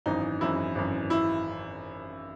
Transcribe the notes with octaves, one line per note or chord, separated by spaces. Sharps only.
G#1 F#2 E3 D#4
G#1 F#2 E3 E4
G#1 F#2 E3
E4